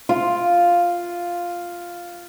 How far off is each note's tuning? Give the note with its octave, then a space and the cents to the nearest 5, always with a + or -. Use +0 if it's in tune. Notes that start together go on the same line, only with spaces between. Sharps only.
F4 +0 D6 +5